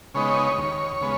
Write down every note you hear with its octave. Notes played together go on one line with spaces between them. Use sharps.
C#3 G#3 B3 D#4 C#5
D#2
C#3 G#3 B3